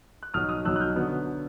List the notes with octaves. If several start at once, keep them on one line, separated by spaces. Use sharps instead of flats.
F#6
B1 B2 F#3 D#6 F6
D#6 F6
B1 B2 F#3 E6 F#6
F#6
F6 G6
D3 F#3 B3